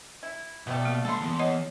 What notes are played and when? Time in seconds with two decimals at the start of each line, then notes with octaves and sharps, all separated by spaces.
0.23 E4
0.67 B2 G3 A3 B3
0.85 A#3
1.05 G#3 A4 B5 C6
1.21 E3 B3
1.39 C#5 D#5 F#5